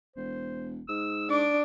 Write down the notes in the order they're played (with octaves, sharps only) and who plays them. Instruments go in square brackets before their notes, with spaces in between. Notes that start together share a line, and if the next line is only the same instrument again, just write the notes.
[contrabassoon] E1 [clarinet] C5
[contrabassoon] G#2 [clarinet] E6
[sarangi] D4 [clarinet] D6